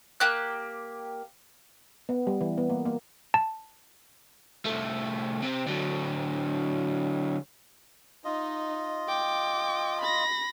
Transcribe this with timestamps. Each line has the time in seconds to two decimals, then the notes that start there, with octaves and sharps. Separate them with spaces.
0.20 A#3 G4 F#6
2.09 B3
2.27 G3
2.41 E3
2.58 B3
2.70 A#3
2.85 A#3
3.34 A5
4.65 C2 A3
5.42 C3 C4
5.66 D3 F#3
8.25 D#4 F4 D#5
9.09 G5 D6
10.01 B5 A#6